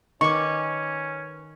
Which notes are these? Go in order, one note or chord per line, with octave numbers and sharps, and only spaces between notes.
D#3 C#4 B4 C#6 D6